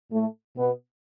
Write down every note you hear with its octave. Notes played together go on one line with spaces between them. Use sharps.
A2 A3
B2 B3